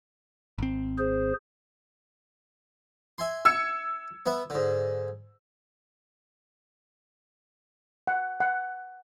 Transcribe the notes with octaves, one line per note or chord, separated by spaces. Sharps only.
G#1 C4
G#4 C5
E5 G#5 C6
E6 G#6 C#7
B3 B4 E5
G#2 D3
F#5
F#5